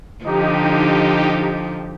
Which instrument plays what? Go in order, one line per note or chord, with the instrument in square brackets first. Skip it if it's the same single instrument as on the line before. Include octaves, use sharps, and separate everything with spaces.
[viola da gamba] D3 F3 [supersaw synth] D#4 G4